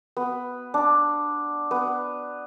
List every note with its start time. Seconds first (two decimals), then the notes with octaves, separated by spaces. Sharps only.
0.17 B3
0.74 D4
1.71 B3